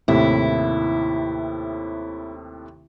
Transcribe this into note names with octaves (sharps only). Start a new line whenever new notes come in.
D#2 A2 C3 E4